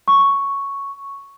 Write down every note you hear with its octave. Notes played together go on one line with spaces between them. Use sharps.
C#6